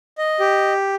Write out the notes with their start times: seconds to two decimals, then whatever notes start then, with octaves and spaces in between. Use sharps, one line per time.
0.18 D#5
0.40 G4